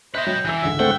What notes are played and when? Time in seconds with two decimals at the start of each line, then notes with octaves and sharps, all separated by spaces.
0.14 B4 C5 D#5 E5 F#6
0.27 F#3 G5
0.45 E3 E6 F#6
0.62 C#2 G#2 D3 E5
0.79 A3 C4 F#5 G5